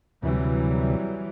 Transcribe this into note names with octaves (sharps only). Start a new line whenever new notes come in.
D2 C3 E3 F#3 G3